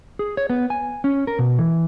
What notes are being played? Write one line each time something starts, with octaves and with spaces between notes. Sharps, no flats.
G#4
C#5
B3
G#5
C#4
A#4
B2
E3